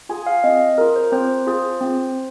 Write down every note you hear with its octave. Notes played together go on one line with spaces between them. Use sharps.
F4 G#4 G#5
F5
C4 D#5
F4 G#4 A#4
C5
C4 C5
F4 G#4
C4